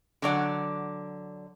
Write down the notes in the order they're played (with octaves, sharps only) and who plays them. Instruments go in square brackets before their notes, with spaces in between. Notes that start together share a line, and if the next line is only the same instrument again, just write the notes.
[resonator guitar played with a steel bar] D3 F#3 D5 F#5